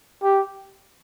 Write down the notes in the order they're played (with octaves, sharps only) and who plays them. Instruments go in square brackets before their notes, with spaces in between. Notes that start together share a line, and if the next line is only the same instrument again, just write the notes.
[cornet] G4